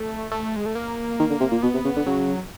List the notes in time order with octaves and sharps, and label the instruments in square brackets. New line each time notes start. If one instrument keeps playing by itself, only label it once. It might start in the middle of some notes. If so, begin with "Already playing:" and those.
Already playing: [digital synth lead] A3
A3
G#3
A3
A#3
[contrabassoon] D#3
D3
C3
A#2
[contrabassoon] B2 [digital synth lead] B3
[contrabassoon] C3
C#3
D3
[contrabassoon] C#3 [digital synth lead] F#3